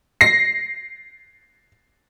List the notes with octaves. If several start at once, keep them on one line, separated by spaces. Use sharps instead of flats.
A#6 C7